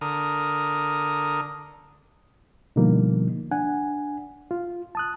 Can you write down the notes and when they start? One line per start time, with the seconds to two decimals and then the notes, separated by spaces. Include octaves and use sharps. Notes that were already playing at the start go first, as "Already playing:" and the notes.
0.01 D3 A#4 D#6
2.76 B2 D3 F3 G3 A#3 D#4
3.51 D4 F#5 G#5
4.51 F4
4.95 A5 D#6 F#6